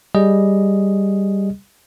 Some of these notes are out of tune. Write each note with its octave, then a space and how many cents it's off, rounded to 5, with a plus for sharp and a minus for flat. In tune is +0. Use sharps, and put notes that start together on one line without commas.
G3 +0 G#4 +0 D#5 +0